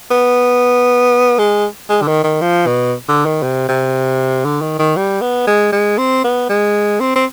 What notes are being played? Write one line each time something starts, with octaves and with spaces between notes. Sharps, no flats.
B3
G#3
G#3
D3
D#3
D#3
F3
B2
D3
D#3
C3
C3
D3
D#3
D#3
G3
B3
G#3
G#3
C4
B3
G#3
C4
C4